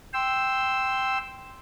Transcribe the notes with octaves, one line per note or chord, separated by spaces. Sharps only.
G5 C6 E6